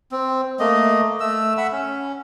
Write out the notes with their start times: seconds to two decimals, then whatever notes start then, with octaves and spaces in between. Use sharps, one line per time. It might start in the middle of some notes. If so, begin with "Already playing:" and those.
0.12 C4
0.60 A3 A#3 D#5
1.20 A3 E6
1.57 E5 F#5 B5 E6
1.72 C#4